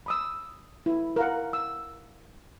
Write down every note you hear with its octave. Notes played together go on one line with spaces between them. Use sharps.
B5 D#6 E6
E4
A#4 F5 F#5
E6